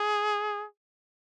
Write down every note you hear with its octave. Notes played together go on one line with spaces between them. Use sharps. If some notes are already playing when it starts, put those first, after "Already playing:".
Already playing: G#4